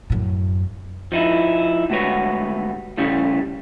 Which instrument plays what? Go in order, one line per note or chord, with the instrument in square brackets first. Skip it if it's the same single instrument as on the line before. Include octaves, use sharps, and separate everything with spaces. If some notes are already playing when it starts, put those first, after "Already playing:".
[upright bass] F#2 A2
[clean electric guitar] F3 D#4 E4
D2 G#2 G3 F#4 B4 C#5
A2 C#3 G3 C#4